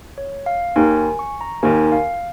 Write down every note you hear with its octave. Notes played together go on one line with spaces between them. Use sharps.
C#5
F5
D#2 D#3 A#3 G#5
G#5
C#6
A#5
D#2 D#3 A#3 G#5
F5